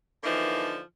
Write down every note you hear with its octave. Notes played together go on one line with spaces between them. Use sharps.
D3 E3 F3 A#3 D#4